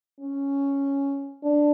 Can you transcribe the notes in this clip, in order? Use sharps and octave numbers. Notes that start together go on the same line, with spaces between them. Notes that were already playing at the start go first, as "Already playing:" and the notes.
C#4
D4